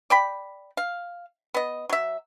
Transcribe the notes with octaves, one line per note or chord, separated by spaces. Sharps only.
D5 G5 B5
F5
B3 D#5
F#3 E5